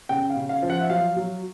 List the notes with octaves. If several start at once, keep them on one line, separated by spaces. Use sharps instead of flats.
C#3 G5
F5
C#3
F5
F3
F#5
E5
F#3 F5
F#3